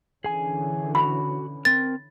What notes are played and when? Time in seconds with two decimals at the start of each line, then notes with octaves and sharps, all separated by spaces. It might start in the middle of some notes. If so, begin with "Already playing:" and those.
0.24 D3 E3 C#4 G#4 G#5
0.95 F#4 B5
1.65 C4 A#4 A6